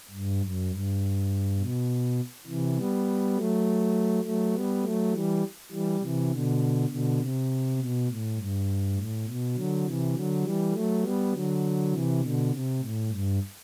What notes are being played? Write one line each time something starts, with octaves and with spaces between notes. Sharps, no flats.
G2
F#2
G2
B2
C3 E3
G3 B3
F#3 A3
F#3 A3
G3 B3
F#3 A3
E3 G3
E3 G3
C3 E3
B2 D3
B2 D3
C3
B2
A2
G2
A2
B2
D3 F#3
C3 E3
D3 F#3
E3 G3
F#3 A3
G3 B3
D3 F#3
C3 E3
B2 D3
C3
A2
G2